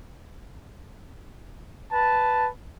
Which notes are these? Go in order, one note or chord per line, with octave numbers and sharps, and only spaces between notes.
B4 A5